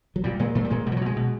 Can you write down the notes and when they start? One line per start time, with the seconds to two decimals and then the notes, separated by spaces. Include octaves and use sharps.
0.16 F#3
0.24 A#2 G3
0.39 A#2 G#3
0.55 A#2 A3
0.64 G3
0.70 A#2 G#3
0.86 B2 G3
0.92 F3
0.97 F#3
1.01 B2 G#3
1.16 B2